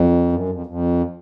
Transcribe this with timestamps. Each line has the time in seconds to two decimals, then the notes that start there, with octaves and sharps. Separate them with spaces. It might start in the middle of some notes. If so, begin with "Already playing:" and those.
Already playing: F2
0.32 F#2
0.49 F2
0.66 F2